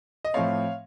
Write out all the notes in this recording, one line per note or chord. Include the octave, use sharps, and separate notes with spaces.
D#5
A2 F3 A3 C4 C#5 F5